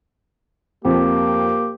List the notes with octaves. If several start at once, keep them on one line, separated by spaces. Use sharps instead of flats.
F2 A#3 G4